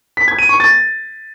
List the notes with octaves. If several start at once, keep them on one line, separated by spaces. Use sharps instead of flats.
B6
G#6
D#7
C#6
A6